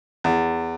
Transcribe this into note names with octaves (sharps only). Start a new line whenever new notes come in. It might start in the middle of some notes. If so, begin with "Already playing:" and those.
E2